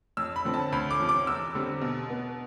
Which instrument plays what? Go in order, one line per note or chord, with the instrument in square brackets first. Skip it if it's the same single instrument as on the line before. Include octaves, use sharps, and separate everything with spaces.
[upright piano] F2 E6
B5
D3 F3 C4
A5
D2 B5
D6
C3 F3
D6
E2 E6
D3 G3 C4
B2
B3